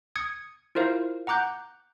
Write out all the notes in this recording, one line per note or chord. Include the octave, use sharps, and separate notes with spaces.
D#6 G#6 C#7
E4 F4 A#4 C5 F5
F#5 A#5 D6 F#6 G6